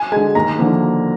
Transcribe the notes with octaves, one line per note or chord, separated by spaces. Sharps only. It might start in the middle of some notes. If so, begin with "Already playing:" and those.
Already playing: G#5
D3 G#3 G#5
D#2 A#5
D3 F3 A#3